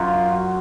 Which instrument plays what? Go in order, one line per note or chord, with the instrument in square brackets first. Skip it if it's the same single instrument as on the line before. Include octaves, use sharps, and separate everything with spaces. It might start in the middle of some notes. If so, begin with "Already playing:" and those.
Already playing: [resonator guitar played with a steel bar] F#2 [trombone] F4
[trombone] F#4